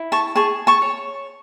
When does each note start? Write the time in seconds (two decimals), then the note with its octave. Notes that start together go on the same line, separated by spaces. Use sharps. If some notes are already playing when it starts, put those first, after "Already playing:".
Already playing: E4
0.12 A5 C#6
0.36 G#4 A5 C#6
0.67 A5 C#6
0.82 C#5